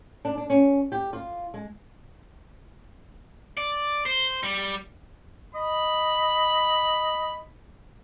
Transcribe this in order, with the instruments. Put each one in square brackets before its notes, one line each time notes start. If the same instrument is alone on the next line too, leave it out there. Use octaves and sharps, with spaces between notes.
[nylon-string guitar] D4
D4
C#4
G4
F4
G#3
[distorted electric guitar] D5
C5
G3
[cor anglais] D#5 [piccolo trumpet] B5